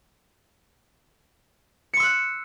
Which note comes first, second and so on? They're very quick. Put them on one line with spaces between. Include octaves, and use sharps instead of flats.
C#7 C6 E6 F#6